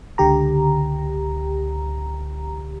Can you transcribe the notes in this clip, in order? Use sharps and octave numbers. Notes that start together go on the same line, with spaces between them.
C#2 D3 G4 A#5